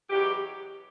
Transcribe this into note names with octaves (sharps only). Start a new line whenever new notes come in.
E2 B2 F#3 G4